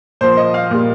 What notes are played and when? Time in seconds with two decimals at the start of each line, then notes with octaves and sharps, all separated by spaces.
0.21 A#2 F3 C5
0.37 D#5
0.54 F5
0.71 A#2 G3